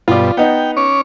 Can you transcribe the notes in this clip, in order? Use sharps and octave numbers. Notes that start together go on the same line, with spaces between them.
G2 B2 F4 D5
B3 D#4 G5
C#4 C#5 D6